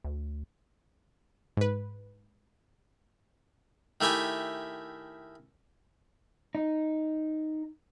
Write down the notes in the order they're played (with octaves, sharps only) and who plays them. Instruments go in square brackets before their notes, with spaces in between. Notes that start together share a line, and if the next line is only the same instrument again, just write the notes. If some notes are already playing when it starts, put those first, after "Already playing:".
[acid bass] D2
[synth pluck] G#2 B4
[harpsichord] D#3 A3 E4 G4 G#5
[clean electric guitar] D#4